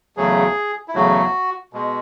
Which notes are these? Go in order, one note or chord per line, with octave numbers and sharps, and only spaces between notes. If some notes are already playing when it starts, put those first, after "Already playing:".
E2 C#3 F#3 A3 G#4
E4
E2 C#3 F#3 A3 F#4
B2 G#3